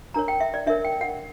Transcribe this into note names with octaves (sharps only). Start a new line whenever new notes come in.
D4 A#4 C#5 A#5
G5
E5
D5
D4 A#4 C#5 E5
G5
F#5